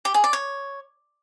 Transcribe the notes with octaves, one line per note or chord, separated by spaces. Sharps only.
G4
G#4
D5
C#5